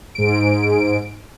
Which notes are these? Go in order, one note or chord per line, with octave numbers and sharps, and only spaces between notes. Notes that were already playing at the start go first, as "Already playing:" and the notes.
G#2 D7